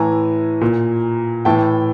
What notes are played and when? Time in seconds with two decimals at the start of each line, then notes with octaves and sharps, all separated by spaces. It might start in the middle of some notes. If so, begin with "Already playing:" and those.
Already playing: A2 E3 G#5 A#5
0.61 A#2
1.45 A2 E3 G5 A5